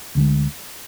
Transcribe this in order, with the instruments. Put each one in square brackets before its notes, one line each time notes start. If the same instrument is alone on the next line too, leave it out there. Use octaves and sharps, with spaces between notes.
[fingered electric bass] D2 D3 G#3